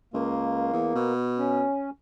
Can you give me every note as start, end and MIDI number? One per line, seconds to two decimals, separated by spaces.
0.14 0.70 37
0.14 1.13 58
0.73 0.94 40
0.95 1.65 47
1.38 1.90 61